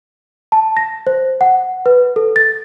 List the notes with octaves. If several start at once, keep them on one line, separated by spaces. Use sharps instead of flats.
A5
A#6
C5
F#5
B4
A4
A6